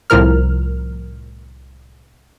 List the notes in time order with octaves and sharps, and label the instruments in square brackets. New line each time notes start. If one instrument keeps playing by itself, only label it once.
[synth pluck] C2 A2 F3 A#4 F6